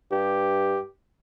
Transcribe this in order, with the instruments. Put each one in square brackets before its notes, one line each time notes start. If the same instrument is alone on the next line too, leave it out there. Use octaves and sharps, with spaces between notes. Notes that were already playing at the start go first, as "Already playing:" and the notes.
[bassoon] G2 [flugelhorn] G4